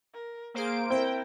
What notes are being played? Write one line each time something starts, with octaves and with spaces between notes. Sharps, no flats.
A#4
A#3 G#4 C5 F5 D7
C4 E4 A#4 G5